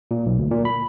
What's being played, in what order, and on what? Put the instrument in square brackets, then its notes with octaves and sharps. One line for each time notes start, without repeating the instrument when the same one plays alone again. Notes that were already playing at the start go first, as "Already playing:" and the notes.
[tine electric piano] A#2
B1
D2
A#2
B5